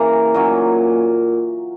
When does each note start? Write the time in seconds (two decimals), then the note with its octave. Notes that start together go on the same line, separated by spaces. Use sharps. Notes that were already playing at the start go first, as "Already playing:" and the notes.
Already playing: C#3 E3 A#3 A#4 A#5
0.34 A#2 F#3 C#4